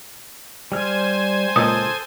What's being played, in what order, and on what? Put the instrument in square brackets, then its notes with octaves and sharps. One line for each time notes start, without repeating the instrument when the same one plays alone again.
[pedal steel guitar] G3 F6 [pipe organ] C5 G#5
[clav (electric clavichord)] C#2 A#2 [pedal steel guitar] A4 [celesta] D#6